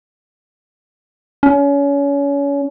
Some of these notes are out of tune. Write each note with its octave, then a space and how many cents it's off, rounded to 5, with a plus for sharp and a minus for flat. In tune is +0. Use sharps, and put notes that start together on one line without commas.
C#4 +30